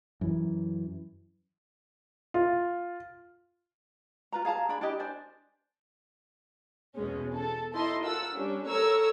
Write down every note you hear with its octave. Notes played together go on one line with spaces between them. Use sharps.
F#2 E3
F4
F4 B4 A#5
G#4 F5 A5 A#5
D4 G#4 B5
D4 E4 G4 D#5
D4 C5 D5 G#5
E2 B2 G#3 C#4
A4
D#4 E4 A4 D#5 C6
F4 A4 A#4 F#5 E6
G3 C#4 D4
A4 A#4 C#5 A#5 C#6 E6